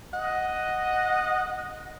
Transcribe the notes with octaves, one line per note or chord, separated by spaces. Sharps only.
D#5 F#5